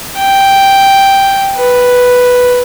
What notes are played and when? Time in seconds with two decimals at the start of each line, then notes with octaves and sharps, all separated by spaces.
0.18 G5
1.57 B4